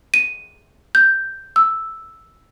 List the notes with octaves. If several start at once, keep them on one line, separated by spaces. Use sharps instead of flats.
D#7
G6
E6